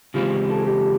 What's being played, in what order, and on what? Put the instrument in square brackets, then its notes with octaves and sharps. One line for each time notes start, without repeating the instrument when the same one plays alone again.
[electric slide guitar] C#3 E3 G#3 C4 [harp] F4 G4
[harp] A4
G#4
G4 A4